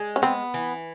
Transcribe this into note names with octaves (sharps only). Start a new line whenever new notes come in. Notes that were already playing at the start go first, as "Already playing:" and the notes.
Already playing: G#3
C#4
B3 C4
E3